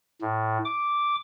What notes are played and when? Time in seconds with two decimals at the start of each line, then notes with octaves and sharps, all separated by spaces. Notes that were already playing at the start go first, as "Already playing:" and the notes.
0.22 A2
0.65 D6